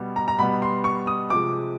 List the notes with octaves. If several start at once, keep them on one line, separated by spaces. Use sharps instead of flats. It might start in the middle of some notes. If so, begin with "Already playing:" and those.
Already playing: B2 G3 B3
A#5
A#5
B2 G3 B3 B5
C6
C#6
D#6
C3 F3 G#3 D6